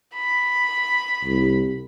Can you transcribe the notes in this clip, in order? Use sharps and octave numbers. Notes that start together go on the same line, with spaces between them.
B5
C2